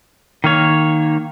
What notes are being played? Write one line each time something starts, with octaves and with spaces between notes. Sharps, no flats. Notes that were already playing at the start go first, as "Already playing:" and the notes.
D#3 A#3 C#5